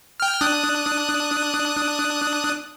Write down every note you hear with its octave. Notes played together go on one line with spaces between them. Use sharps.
G5 F6
D4 D#6 F#6